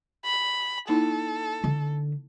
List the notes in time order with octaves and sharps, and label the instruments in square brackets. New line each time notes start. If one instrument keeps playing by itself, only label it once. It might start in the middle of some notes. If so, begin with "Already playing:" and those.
[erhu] B5
[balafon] A#3 D#4 E4 [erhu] A4
[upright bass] D3